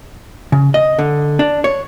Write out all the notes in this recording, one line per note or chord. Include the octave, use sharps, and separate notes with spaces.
C#3
D#5
D3
D4
C#5